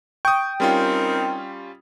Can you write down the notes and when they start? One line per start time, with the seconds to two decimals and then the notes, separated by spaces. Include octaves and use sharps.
0.25 G5 C#6 D#6
0.60 G3 C4 C#4 D#4 F4 A#4